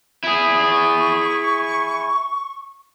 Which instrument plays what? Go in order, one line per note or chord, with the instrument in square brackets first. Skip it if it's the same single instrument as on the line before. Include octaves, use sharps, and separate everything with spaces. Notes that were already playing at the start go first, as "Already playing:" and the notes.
[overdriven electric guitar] E4 G#4
[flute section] C#6